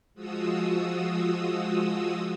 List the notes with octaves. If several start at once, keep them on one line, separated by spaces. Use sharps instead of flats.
F3 G#3 F4 F#4 D#6 E6